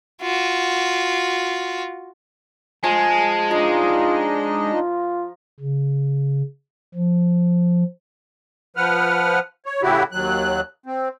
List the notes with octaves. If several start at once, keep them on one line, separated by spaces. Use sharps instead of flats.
F4 F#4
F3 G#3 G#5
D4 D#4 F4 D#5 A#5
F4
C#3
F3
F3 B4 F#5 F6
C#5
A2 C#3 E4 F#4 G4
D#2 F#3 F#6
C4